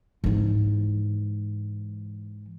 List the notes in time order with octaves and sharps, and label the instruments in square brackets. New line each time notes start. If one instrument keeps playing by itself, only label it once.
[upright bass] G#2 E3